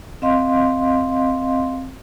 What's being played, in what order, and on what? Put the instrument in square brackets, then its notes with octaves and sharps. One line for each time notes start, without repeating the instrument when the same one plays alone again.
[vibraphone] C4 D#5 F5 C6